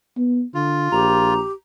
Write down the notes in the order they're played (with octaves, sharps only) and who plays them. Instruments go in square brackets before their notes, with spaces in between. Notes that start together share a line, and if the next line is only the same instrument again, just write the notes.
[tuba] B3
[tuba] D3 [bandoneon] F4
[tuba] A#1 [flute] G4 [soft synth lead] A#5